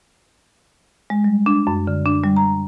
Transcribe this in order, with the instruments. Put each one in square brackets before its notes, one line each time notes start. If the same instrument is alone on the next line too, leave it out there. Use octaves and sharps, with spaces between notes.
[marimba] G#3
G3
D4
F#2
D3
D4
G3
A#5